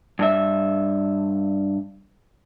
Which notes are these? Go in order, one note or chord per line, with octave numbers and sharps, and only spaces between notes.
G2 E5